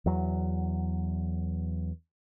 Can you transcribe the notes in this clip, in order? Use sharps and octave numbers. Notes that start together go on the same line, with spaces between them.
E2 F#3